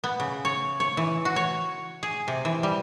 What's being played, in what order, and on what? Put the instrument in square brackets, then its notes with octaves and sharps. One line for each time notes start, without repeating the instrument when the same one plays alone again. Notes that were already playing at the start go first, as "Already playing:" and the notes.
[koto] B3
C#3
C#5
C#5
E3
F#4
C#5
G#4
C3
E3
G3